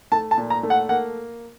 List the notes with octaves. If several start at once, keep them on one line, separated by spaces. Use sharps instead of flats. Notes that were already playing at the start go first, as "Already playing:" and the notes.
A3 A5
A5
A#2
A#5
A3
F#5
A#3 F#5